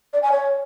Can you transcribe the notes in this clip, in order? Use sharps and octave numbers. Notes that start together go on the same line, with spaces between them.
D5
G#5
C#5